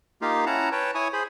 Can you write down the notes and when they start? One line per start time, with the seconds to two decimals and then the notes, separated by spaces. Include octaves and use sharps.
0.22 A#3 D#4 F4 G4 F5
0.46 C#4 E4 F#5 A5 A#5
0.72 B4 C#5 G5 A5
0.95 E4 C#5 G#5 C#6 D#6
1.13 G#4 C5 B5